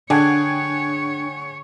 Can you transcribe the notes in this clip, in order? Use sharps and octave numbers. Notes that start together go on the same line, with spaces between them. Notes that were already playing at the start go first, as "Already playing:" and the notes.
D3 D4 G#4 C#5 F#5 G5 G#6